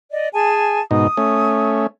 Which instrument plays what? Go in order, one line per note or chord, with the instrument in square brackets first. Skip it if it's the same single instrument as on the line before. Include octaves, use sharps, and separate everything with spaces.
[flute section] D5 D#5
G#4 G#5 A5
[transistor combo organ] G#2 B2 D#4 [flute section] D#6
[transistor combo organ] A3 C#4